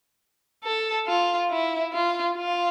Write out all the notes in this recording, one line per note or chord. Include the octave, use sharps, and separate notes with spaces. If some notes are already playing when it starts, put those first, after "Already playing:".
A4
F4
E4
F4
F4